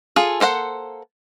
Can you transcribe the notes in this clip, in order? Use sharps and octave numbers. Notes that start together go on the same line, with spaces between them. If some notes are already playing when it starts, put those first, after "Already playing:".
F4 G#4 A4
A#3 A4 C5 F#5